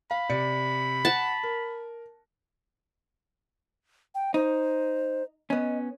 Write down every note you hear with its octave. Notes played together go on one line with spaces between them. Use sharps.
F5 B5
C3 D5 C#7
F#5 A5
A#4
G5
D#4 C5
B3 C#4 D#5